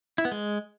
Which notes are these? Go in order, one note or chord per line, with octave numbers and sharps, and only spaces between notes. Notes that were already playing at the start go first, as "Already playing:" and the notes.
E4
B3
G#3